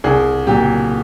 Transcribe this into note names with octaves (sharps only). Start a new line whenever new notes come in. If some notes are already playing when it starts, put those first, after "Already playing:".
C2 G#4
A#2 F#3 G4